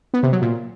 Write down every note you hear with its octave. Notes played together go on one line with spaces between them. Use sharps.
B3
C3
F#3
A#2